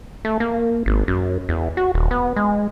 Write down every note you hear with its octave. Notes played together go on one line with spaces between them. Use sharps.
A3
A#3
G#1
F#2
E2
F#4
D#1
B3
G#3